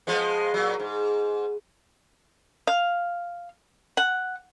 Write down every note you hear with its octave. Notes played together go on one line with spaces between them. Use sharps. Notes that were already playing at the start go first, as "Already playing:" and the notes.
F3 G#3 B3
A#2 F#3
G#2
F5
F#5